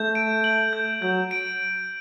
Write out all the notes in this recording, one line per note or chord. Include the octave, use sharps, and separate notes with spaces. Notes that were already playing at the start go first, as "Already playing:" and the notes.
Already playing: A3 G6
D7
F#7
G6
F#3 G6
D7